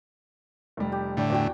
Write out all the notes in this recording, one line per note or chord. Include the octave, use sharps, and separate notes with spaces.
F1 G3
G4
A2 D3 G4 D5 G5
E2 F#4 D5 G5